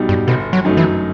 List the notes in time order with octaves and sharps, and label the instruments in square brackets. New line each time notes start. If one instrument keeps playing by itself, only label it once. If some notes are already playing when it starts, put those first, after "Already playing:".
Already playing: [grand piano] B1 B2 G3 D#4
[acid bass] G2
[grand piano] G1 [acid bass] B2
[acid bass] F#3
[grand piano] F#2 F#3 A3 D#4
[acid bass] E3